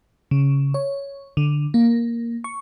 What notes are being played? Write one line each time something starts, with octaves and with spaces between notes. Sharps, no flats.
C#3
C#5
D3
A#3
C#6